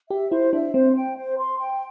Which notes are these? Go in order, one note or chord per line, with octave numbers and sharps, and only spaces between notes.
G4 E5
E4 C5
D4 E5
C4 C5
G5
C5
C6
G5